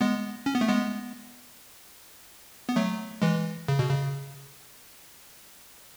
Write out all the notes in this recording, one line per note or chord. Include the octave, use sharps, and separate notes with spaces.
G#3 B3
C#4
B3
A3
G#3 B3
B3
F#3 A3
E3 G#3
C#3
B2
C#3